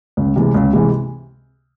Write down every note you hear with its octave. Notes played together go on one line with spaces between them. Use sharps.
C#2
C3 E3 G#3
C#2
C3 E3 G#3